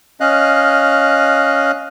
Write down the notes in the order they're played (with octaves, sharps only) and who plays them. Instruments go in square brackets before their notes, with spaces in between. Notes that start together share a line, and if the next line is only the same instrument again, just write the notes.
[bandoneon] C#4 D#5 F5 F#6